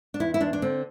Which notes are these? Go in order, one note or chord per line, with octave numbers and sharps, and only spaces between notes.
D4
E2 E4
E4
E2 D4
D4
D3 C4